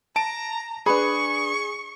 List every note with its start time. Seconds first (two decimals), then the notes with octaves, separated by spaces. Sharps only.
0.16 A5 A#5 D7
0.86 D4 G#4 B4 B5 C#6